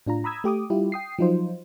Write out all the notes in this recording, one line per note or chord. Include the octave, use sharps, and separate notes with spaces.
A2 D4 F4 A#5
A#5 B5 D#6 E6 G#6
A3 G4 D6 D#6
G3 E4 F4 G4
G5 D#6 C7
F3 F#3 D#4 F4 C5